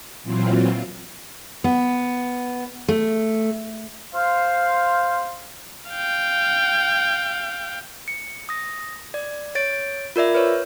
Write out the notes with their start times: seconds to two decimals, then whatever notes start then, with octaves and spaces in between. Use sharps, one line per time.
0.23 A#2 E3 F#3 C4 F4
1.64 B3
2.88 A3
4.14 C5 F5
5.90 F5 G5
8.08 C#7
8.49 D#6 A#6
9.14 D5
9.55 C#5 A6 D7
10.16 F4 A#4 D5 E5
10.35 B4 C#5